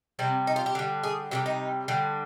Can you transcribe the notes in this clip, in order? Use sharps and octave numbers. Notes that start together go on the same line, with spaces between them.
C3 G3 C4
D#4
F4
G4
D3 G3
G#4
C3 D#3 G3 G4
D#4
D3 G3